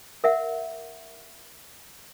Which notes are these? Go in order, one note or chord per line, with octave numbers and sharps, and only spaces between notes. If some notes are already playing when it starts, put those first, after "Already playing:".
A#4 E5 F#5